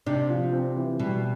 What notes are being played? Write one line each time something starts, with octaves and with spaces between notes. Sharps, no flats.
C3 D4
F3
C4
E3
B2 G3